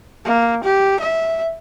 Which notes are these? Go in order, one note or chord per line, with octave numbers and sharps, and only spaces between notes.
A#3
G4
E5